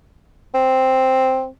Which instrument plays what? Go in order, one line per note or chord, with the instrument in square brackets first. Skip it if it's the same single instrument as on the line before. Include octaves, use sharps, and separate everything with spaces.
[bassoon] C4